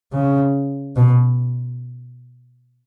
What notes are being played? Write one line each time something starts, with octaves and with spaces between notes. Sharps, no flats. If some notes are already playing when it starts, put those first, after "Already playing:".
C#3
B2